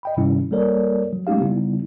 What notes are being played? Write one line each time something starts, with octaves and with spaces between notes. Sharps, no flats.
D#5 G5 B5
G2 C3 D#3 G3 C#4 E4
G3 A#3 A4 A#4 C#5 D5
F#3
G#3 A3 C#4 D#4 G4 F5
C#3 G3 B3 D#4 E4